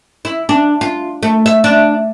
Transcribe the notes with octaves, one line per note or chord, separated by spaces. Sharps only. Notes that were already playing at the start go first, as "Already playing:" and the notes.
E4
D4
F4
A3
E5
D4